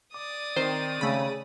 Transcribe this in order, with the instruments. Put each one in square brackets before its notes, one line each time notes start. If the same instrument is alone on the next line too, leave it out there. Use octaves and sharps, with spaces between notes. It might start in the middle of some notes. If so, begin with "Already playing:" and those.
[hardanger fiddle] D5 D#6 [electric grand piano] D6
[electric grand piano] D#3 C4 D#4 [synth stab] C5
[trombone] C#3 [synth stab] A3 B5